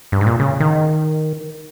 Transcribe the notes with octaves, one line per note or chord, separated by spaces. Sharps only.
G2
G#2
A#2
C#3
D#3